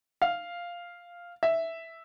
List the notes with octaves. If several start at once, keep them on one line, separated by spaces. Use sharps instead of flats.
F5
E5